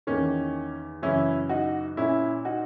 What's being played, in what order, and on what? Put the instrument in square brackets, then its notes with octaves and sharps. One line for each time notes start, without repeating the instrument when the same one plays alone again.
[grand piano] E2 D#3 A#3 C#4
F#2 C#3 E3 C#4 E4
D#4 F#4
A#2 C#4 E4
D#4 F#4